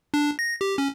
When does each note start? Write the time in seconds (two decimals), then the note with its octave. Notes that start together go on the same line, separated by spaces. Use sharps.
0.14 D4
0.39 A#6
0.61 G4
0.78 C#4